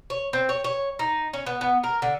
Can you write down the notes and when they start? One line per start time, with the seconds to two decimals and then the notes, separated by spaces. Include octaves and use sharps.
0.10 C#5
0.33 C4
0.49 C#5
0.64 C#5
0.99 D#4
1.34 C#4
1.46 B3
1.61 B3
1.84 A#4
2.02 D3